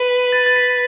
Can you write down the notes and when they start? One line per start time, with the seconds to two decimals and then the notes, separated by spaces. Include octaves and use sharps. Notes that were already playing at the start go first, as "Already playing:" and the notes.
Already playing: B4
0.32 A6
0.46 A6
0.56 B6